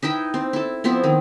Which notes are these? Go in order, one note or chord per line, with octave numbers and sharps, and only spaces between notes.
D#4 E4 B4 G5
C4
E4 A4
F3 B3 C4 E4
D#3